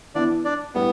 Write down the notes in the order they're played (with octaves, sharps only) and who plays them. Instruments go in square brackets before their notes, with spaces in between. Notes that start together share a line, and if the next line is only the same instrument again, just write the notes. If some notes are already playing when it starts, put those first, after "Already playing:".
[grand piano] E3 B3 E4 [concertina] D4 D5
[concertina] D4 D5
[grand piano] A2 G3 E4 [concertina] B3